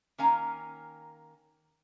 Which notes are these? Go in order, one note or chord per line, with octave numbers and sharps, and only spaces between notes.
D#3 A#3 C#4 F5 G#5 A#5